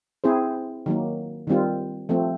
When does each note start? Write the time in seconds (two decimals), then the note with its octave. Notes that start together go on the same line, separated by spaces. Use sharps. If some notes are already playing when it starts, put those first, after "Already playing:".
0.24 C4 E4 G#4 C5
0.86 D#3 F#3 A#3
1.47 D#3 G3 C4 F4
2.09 F3 A3 C4